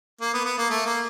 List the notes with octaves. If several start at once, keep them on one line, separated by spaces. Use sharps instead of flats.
A#3
B3
B3
A#3
A3
A#3